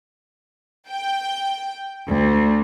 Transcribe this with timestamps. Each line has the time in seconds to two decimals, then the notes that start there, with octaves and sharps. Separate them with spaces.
0.89 G5
2.08 D2